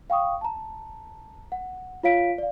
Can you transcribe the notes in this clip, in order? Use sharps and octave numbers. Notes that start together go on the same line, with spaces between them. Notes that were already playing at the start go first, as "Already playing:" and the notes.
F5 G5 C#6 D#6
A5 A#5
F#5
F4 C#5 F5 B6 D7
D5 F5